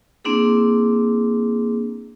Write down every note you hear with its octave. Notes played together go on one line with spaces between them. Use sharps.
A#3 C4 D4 E4 G#4